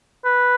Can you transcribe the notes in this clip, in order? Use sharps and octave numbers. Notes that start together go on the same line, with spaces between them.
B4